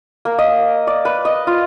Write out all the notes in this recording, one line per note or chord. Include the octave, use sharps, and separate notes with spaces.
A#3
D#5
D5
B4
D#5
F4